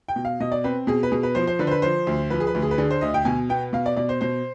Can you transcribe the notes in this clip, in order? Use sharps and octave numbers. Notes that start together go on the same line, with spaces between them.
G5
B2
F5
B2 D#5
D5
C4 B4
B2 G#4
B4
B2 G#4
B4
F3 C5
C5
D3 B4
C5
B4
F3 C5
D2
F3 B4
G#4
B4
D2
G#4
B4
D3 G#4
C5
D2 D#5
G5
B2 G#5
B3 G5
B2 F5
D5
B2 D5
C5
B2 C5